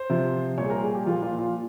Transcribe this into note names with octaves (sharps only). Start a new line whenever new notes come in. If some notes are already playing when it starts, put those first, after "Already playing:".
Already playing: C5
C3 F3
A#2 G3 C#5
G#4
A#4
G#4
G4
A#2 F3 F4
F4
F4